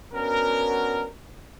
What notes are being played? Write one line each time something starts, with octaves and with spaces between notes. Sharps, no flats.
B3 C#4 D4 F#4 A#4